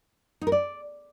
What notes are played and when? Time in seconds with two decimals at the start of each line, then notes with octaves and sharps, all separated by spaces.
0.41 D#4
0.47 A#4
0.52 D5